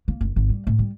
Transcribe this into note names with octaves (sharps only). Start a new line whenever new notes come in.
A#3
F#1
G#1
G3
A2
G3